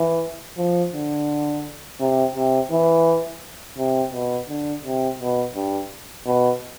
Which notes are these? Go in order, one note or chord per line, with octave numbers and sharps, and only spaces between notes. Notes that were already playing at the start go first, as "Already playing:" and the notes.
Already playing: E3
F3
D3
C3
C3
E3
C3
B2
D3
C3
B2
G2
B2